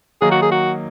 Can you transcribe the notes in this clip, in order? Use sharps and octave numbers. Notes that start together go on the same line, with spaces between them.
D#3 F#3 A#3 D#4 G#4
F#4
G#4
F#4